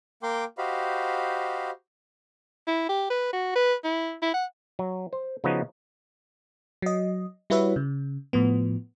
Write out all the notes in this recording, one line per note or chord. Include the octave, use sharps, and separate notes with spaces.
A#3 A#4 G5 C6 D6
F#4 G4 C5 D#5 F5 B5
E4
G4
B4
F#4
B4
E4
E4
F#5
F#3
C5
C#3 F3 B3 D#4 F#4
F#3 D#5
G3 E4 F#4 B4 C#5 E5
C#3
A2 F3 B3